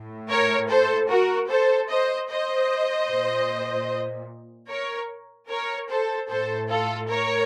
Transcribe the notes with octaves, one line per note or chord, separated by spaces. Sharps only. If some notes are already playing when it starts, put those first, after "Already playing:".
Already playing: A2
A#4 C#5
A4 C5
F#4 A#4
A4 C5
C5 D#5
C5 D#5
A#2
A#4 C#5
A#4 C#5
A4 C5
A2 A4 C5
F4 A4
A#4 C#5